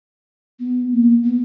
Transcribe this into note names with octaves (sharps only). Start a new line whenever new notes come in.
B3
A#3
B3